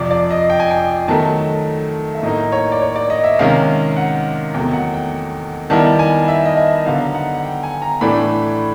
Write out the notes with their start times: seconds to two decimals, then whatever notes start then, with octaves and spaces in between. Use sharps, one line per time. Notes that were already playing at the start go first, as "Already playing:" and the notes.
Already playing: F2 C3 F3 D5
0.11 D5
0.31 D#5
0.50 G5
0.60 G#5
0.71 G5
1.08 D#3 F#3 A3 A5
2.15 E5
2.23 A2 F#3 A#3 D#4 D#5
2.52 C#5
2.72 D5
2.82 C#5
2.96 D5
3.10 D#5
3.24 E5
3.39 C3 D#3 G#3 C#4 F5
3.97 F#5
4.54 E2 C3 D#3 F#3 A3 G5
4.73 F#5
4.94 G5
5.70 D#3 G3 B3 E4 A5
5.99 G#5
6.28 E5
6.46 D#5
6.57 E5
6.86 D3 F#3 B3 D#4 F5
7.14 F#5
7.34 F#5
7.44 G5
7.63 G#5
7.82 A#5
8.01 A2 E3 A3 D4 B5